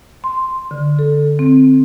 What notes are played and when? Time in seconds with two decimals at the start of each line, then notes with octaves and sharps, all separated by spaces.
0.24 C6
0.71 D3
0.99 A4
1.39 C4